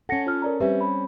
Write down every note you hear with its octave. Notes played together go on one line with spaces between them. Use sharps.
C#4 A4 F#5 A#6 C#7
F4 C#5 F6
A#4 D5 A#5
G3 C4 C#4 G4 B4 E5
B5